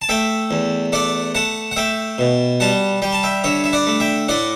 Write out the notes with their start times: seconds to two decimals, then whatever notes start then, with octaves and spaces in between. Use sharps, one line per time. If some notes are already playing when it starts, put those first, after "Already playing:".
0.02 A5
0.09 A3 E5 G5
0.51 E2
0.92 A3 D5 F#5
1.35 A3 F#5 A5
1.71 F#5
1.76 A3 E5 G5
2.18 B2
2.60 G3 F#5 A5
3.02 G3 G5
3.13 A5
3.23 E5 G5
3.44 D3 C#5 E5
3.64 E5
3.73 D5 F#5
3.87 A3
4.00 E5 G5
4.28 A2 D5 F#5